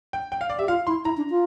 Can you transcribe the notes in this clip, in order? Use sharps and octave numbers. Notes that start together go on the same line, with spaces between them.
G5
G5
F5
D5
G4 E5
F4 F5
E4 C6
E4 A#5
D4
F4